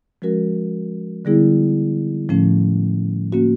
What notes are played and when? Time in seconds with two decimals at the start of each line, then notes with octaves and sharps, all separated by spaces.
0.22 F3 G#3 C#4 F#4 A#4
1.25 D3 G3 B3 E4 G#4
2.29 A2 F3 A3 C#4
3.32 A#3 C#4 F#4